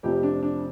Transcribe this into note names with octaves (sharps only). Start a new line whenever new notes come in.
F1 F2 C3 F3 G4
D4
D4